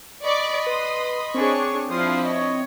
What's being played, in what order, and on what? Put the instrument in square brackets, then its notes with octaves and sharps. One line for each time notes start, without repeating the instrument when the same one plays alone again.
[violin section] D5 C#6 D6 [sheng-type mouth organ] D#5 B5
[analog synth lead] B4 [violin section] C6 D#6
[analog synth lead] C4 [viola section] D4 G#4 C#5 [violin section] C#6
[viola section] F3 F5 [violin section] D4 E4 [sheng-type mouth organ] C6 D#6
[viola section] C#5 [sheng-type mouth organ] D#5